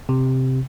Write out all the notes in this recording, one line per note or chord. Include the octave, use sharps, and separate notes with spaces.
C3